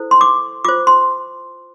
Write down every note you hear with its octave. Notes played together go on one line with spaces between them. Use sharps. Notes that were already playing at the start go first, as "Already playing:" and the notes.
Already playing: E4 A4 C5
C6
D6
F4 C5 D6
C6